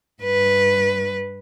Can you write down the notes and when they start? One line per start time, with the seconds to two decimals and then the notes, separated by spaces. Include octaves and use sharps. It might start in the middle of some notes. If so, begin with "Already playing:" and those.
0.22 G2 B4